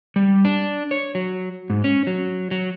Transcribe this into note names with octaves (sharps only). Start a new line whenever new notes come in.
G3
D4
C#5
F#3
G#2
C#4
F#3
F#3